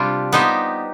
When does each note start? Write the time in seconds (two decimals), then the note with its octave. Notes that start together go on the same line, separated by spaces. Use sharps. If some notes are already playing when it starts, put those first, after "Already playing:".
Already playing: C3 G3 D4 F4
0.32 B3 D#4 G4 C5